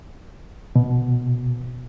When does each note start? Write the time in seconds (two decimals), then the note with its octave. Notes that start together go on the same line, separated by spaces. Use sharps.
0.76 B2